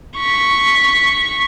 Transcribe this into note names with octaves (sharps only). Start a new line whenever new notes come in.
C#6 B6